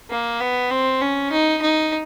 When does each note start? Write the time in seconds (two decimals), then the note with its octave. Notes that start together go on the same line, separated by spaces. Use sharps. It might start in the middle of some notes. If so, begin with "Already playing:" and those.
0.10 A#3
0.41 B3
0.71 C4
1.01 C#4
1.32 D#4
1.62 D#4